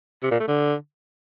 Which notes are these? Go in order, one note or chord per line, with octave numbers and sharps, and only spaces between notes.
C3
A#2
A3
D3